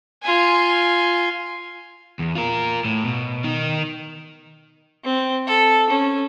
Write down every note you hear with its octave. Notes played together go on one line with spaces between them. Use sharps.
F4 G#5
E2
F4 A#4
A2
B2
D#3 D#4
C4
A4
C#4